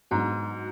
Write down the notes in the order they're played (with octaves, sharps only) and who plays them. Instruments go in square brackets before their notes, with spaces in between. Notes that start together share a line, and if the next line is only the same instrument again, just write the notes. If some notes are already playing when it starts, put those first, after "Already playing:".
[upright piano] G#2 [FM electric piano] F#3 B3 D4 F#4